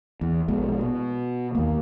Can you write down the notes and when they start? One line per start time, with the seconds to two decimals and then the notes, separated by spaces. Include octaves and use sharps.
0.21 E2
0.48 A#1 B2 G#3
0.81 B2
1.55 D#2 A#3